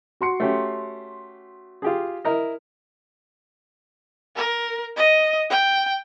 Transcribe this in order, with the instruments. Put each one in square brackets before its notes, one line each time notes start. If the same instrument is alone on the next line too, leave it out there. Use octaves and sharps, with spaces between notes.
[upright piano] F#4 C6 C#7
[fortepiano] A3 C#4 G4
F4 G4 G#4
E4 A#4 D#5
[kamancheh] A#4
D#5
G5